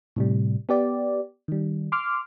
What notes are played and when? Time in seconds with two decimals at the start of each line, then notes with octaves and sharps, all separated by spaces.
0.16 A2 C3 G3
0.69 B3 G4 D5
1.48 D#3 G3
1.92 C6 D6 F6